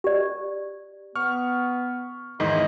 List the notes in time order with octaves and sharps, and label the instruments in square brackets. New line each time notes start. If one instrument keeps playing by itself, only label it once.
[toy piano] G4 D5
[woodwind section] B3 [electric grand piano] C#6 F6
[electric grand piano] E2 G#2 D#3 [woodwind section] E4 [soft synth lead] D#5